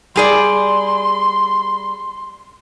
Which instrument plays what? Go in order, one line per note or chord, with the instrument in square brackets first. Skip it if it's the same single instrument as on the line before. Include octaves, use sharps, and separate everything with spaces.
[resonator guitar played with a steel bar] G3 G#4 D5 [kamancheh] C6